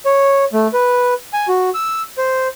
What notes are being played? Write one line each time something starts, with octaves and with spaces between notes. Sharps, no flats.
C#5
A3
B4
G#5
F#4
E6
C5